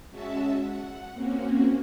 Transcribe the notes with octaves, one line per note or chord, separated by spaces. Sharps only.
G#3 C#4 F#4 E5 A5
F#5
A#3 C4 C#4 F#4